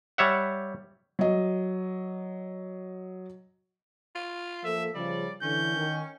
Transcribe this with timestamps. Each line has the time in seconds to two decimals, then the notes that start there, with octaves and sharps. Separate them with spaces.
0.18 G3 C#5 E5 F#5
1.19 F#3 D#5
4.15 F4
4.64 F3 A#3 A4 E5
4.95 C#3 F3 G3 D5
5.42 D3 E3 C#4 G6
5.76 D#3